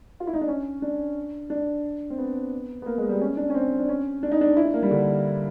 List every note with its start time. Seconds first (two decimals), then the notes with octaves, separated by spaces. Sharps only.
0.20 F4
0.27 E4
0.34 D#4
0.41 D4
0.48 C#4
0.82 D4
1.50 D4
2.10 C4
2.18 B3
2.82 B3
2.86 A#3
2.98 G#3
3.09 G3
3.21 C#4
3.37 D4
3.50 C#4
3.54 C4
3.79 D4
3.89 C#4
4.23 D4
4.32 D#4
4.41 D4
4.57 E4
4.65 D4
4.74 A#3
4.82 G3
4.91 D3